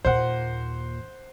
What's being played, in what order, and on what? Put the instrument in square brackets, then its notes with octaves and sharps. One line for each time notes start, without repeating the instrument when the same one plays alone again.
[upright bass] D#2 A#2 [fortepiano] C5 F#5